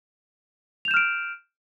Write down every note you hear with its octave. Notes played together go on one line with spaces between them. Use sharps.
F6 G6 D7 E7 F7